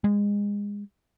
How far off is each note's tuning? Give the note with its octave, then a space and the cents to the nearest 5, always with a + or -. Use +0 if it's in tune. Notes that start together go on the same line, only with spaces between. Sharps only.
G#3 -25